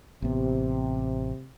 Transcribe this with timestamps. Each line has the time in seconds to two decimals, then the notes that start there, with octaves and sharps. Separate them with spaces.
0.22 A1 C3 B3